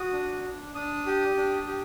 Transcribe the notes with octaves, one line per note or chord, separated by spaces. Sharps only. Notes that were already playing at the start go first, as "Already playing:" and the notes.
Already playing: F#4 D#6
D4
D4
D4 D#6
G4
D4
G4